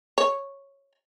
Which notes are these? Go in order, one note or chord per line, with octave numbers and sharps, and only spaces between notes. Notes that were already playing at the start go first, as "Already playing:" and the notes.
C#5